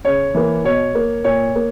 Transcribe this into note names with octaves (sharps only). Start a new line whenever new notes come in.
C#3 C#5
E3 A#3
B2 C#5
A#3
A#2 C#5
A#3